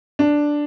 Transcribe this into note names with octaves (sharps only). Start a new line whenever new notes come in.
D4